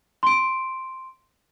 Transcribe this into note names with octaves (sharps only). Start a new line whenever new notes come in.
C6 D7